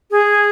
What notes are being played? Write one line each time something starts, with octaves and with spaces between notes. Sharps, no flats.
G#4